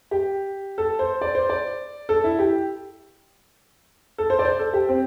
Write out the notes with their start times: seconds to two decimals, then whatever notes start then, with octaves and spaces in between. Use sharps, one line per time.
0.11 G4
0.78 A4
0.99 C5
1.21 D5
1.35 C5
1.49 D5
2.09 A4
2.24 E4
2.39 G4
4.18 A4
4.30 C5
4.39 D5
4.45 C5
4.59 A4
4.73 G4
4.89 C4